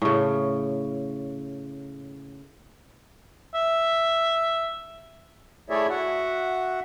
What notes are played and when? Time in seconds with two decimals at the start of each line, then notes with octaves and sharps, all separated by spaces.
0.02 A2 C#3
3.55 E5
5.70 A3 E4 G#4 C#5 D5 E5
5.90 F#4 E5 F#5